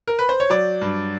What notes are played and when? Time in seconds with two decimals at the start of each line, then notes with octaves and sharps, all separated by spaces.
0.07 A#4
0.19 B4
0.29 C5
0.40 C#5
0.50 F#3 D5
0.81 G2